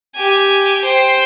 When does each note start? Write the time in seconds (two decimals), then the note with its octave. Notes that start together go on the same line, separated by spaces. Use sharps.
0.15 G4 G#5
0.84 C5 G5